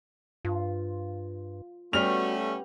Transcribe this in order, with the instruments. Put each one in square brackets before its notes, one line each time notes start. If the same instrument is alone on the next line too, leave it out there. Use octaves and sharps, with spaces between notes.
[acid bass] G2 [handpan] F4
[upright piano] G3 F6 F7 [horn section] A3 C#4 [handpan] B3 G4 [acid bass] F#4